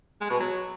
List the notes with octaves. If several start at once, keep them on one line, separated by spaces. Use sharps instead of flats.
G#3
B2
F#3